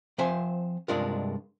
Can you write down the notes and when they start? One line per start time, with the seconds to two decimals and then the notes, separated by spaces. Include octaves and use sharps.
0.18 F3 C4 C5 E5 G#5
0.88 C2 G2 G#3 D4 F4 A#4